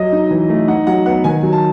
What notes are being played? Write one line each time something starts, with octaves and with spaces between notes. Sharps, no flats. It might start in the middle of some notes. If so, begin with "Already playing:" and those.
Already playing: F#3 D#5
D#4
E3
A3
D#4 F#5
F#3 F#5
B3 F#5
D#3 G#5
F#3
A5